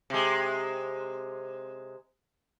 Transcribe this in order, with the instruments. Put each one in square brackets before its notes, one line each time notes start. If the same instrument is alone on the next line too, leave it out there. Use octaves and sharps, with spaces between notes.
[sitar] C3 G#3